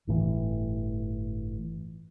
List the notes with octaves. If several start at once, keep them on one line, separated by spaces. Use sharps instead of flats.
G1 A2 D3 E3